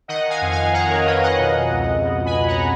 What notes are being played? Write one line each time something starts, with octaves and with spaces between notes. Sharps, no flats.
D#3 D#5 F#5
F5 G#5
F2
F5 G#5
D#3 F#5 A#5
A#4 C#5
F2 B4 D#5
D#5 F#5
B2
C#2
B2
G#5 B5
C#2
F#5 A#5